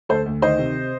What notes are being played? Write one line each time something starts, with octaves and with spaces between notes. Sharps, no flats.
D2 A4 C5
D2
D#3 C5 D#5
C3